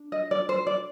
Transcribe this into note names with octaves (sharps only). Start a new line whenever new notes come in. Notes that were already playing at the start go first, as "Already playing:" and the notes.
Already playing: D4
D#5
D5
C5
D5